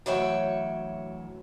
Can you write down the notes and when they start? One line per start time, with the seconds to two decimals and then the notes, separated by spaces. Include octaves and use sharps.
0.06 D2 E3 F#3 C#5 E5 G5